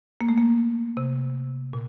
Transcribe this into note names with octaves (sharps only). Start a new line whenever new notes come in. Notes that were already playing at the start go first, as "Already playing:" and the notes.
A#3
A3
A#3
C3
A#2